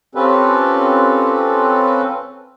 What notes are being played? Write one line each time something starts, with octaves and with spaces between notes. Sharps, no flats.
C4 C#4 F4 G4 A4 B4